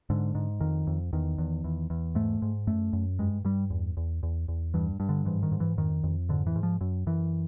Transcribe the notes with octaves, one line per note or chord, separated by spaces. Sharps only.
G#2 D3
G#2
F2 D#3
F2
E2 D#3
E2
E2
E2
G#2 A3
G#2
F#2 A3
F#2
G2 G#3
G2 G3
E2
E2
E2
E2
G2 E3
G2
D3
G#2 E3
D#3
G#2
E3
F2 D#3
F2
G#2 D3
E3
G#2
F3
F#2
F#2 E3